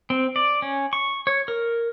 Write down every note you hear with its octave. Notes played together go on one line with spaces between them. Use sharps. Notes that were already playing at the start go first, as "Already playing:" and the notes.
C4
D5
C#4
C#6
C#5
A#4